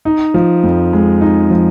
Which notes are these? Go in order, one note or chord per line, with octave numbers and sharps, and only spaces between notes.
D#4
F3
F2
G#3
D#4
F3